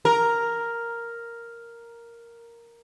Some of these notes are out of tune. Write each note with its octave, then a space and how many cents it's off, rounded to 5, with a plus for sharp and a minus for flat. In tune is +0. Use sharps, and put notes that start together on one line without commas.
A#4 +0